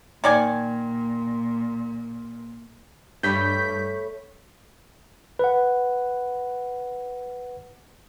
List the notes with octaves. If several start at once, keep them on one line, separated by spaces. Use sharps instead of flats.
A#2 D#3 D5 G#5
G2 A3 C#5 B5 G6 B6
B4 F#5